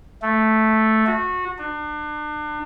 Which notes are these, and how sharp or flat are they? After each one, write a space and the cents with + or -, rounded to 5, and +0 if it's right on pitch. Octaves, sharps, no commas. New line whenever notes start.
A3 -5
F#4 -25
D4 +35